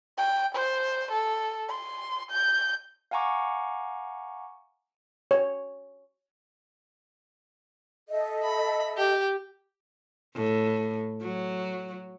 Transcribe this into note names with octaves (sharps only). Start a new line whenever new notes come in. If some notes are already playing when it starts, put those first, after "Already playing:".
G5
C5
A4
C6
G6
F5 F#5 G#5 A#5 C#6 D6
C#5
A4 D#5 E5
B5
G4
A2
F#3